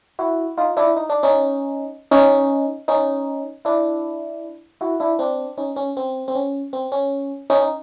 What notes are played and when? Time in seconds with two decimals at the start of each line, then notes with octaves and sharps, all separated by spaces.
0.19 E4 F#4
0.58 D#4 F4
0.77 D4 E4
0.96 D#4
1.10 D4
1.23 C#4 D#4
2.11 C#4 D#4
2.88 C#4 D#4
3.65 D4 E4
4.81 E4 F#4
5.00 D4 E4
5.19 C4 D4
5.58 C#4 D#4
5.76 C#4
5.97 C4
6.28 C4
6.35 C#4
6.73 C4
6.92 C#4
7.50 C#4 D#4
7.61 D#4